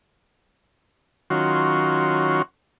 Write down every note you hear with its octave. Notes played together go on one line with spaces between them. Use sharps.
D#3 F#3 C#4 F4 F#4 C6